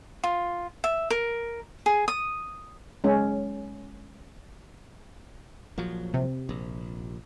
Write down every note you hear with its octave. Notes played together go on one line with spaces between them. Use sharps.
F4
E5
A#4
G#4
D#6
G#3 C#4
A#1 F3 F#3
C3
A#1